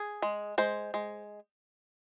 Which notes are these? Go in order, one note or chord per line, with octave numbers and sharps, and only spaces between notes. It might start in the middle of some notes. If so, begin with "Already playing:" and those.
Already playing: G#4
G#3
G#3 C5
G#3